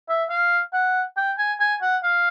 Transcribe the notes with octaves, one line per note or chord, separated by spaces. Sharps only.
E5
F5
F#5
G5
G#5
G#5
F#5
F5